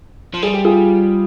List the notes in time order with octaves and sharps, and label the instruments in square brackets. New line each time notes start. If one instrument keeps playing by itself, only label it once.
[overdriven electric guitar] F3
[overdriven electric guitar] G3 [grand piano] G#4
[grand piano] G4
F4 G#4